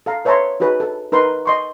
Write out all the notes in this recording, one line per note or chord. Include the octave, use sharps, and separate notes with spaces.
A4 F5 A#5
B4 C#5 E5 A5 A#5 C6
D#4 F#4 G#4 B4
A4
D#4 A#4 B4 C6
D#5 C6 C#6